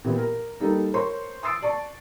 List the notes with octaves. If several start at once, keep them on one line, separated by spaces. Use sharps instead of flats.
A#2 E3 B3 G4
A#4
G3 A#3 D#4 A4
A#4 C5 C#5 C6 C#6
C6 D#6 E6 A6 C7 D7
D5 A5 C#6